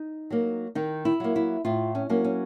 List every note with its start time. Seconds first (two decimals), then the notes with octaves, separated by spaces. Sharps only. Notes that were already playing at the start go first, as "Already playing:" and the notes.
Already playing: D#4
0.30 F#3 A#3
0.75 D#3 D#4
1.05 E4
1.20 F#3 A#3
1.36 E4
1.65 A2 F4
1.95 C#4
2.10 F#3 A#3 C#4
2.25 C#4